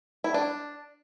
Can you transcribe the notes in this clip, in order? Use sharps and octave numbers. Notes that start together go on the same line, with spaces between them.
E4
D4